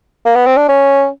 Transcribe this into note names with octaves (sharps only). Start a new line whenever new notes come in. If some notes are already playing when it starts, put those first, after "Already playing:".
A#3
B3
C4
D4
C#4